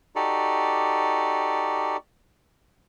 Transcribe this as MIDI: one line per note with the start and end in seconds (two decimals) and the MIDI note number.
0.16 1.97 63
0.16 1.97 66
0.16 1.97 67
0.16 1.97 69
0.16 1.97 74